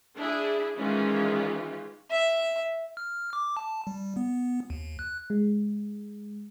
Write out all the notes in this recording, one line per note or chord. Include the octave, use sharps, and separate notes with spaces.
D4 E4 G#4
D#3 E3 G#3 C#4 F4
E5
F6
D6
A5
G3
B3
D#2
F#6
G#3